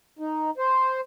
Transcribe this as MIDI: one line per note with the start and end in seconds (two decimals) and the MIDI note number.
0.19 0.50 63
0.58 1.01 72